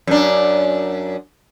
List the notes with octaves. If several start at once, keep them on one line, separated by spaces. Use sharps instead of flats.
F#2 D4